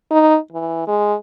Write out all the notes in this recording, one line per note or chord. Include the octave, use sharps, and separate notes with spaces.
D#4
E3
G#3